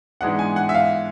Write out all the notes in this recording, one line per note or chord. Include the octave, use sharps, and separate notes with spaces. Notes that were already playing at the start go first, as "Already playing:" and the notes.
G#2 E3 G#3 B3 D4 F#5
G#5
F#5
E5
F5